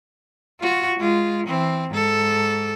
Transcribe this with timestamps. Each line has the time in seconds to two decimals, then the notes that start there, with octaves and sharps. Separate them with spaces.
0.60 F4 F#4
0.99 G#3 F4
1.47 E3 C4
1.90 G#2 A4